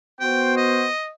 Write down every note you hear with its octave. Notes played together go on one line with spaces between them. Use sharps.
B3 F#4 C5 G5
D#5